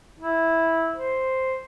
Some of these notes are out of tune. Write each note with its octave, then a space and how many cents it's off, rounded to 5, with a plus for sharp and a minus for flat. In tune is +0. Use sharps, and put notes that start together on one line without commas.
E4 -10
C5 +0